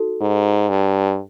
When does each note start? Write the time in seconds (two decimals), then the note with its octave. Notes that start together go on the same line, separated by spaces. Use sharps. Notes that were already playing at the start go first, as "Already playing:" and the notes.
Already playing: D#4 F#4 A4
0.21 G#2
0.69 G2